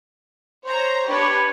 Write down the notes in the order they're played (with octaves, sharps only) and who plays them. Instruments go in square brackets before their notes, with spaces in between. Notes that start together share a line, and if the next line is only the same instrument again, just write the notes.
[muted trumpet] C5 [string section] C#5 A#5
[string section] D4 G4 B4 [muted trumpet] C#5